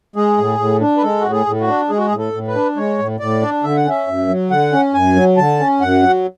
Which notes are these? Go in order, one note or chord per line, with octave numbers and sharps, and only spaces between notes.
G#3 G#4
A2
A2
D4
B4
G#3 A4
A2 F#4
G#4
A2
F#4
D4
G#3 G#4
F#4
G#4
A2
A4
A2
B4
D4
G#3 C#5
A2
A2 D5
D4
D3 E5
F#5
C#4 E5
F#2
F#3
D3 F#5
C#4
F#2 G#5
F#3
D3 A5
C#4
F#2 F#5
F#3